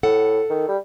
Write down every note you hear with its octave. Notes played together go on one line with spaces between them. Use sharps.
A2 A4 F#5
D#3
G3